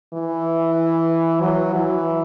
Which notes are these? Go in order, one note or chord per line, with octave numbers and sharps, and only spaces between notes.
E3
F#3
E3